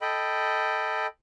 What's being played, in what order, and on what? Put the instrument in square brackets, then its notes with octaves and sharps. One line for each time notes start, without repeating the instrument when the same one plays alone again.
[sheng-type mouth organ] A4 D#5 G5 B5